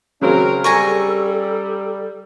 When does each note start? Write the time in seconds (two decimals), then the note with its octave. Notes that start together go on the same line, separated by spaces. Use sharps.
0.21 C#3 F#3 C4 C#4 A#4
0.64 G3 A4 G#5 A#5 C#6